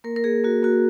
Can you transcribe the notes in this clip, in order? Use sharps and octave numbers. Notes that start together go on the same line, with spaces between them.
A#3 A#4
A#4
A#3 G#4
A#3 F#4
A#3 F#4